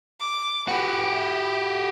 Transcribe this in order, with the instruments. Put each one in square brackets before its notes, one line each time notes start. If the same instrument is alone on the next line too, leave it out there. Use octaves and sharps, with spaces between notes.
[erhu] D6
[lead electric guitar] F#4 G4 [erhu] B4
[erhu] E4